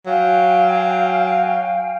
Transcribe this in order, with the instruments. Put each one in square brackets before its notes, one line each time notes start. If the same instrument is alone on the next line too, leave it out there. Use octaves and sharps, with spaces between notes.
[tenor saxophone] F#3 [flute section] F5 G5 G#5